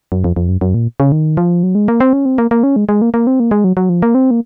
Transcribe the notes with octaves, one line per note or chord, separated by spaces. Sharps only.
F#2
F2
F2
F#2
F#2
A#2
C#3
D#3
F3
F#3
G#3
A#3
C4
C#4
C4
A#3
A#3
C#4
G#3
G#3
A#3
A#3
C4
A#3
G#3
F#3
F#3
F3
A#3
C4
A#3